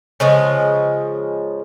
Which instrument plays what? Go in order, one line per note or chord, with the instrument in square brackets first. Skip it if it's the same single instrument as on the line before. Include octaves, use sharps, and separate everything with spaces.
[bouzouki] C#3 F3 G#3